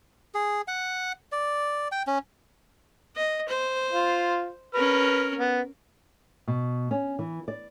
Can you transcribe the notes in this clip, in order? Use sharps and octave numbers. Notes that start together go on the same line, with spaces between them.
G#4
F#5
D5
G5
C#4
D#5
C5
F4
C#4 A#4 B4 F6
B3
B2
C#4
E3
D5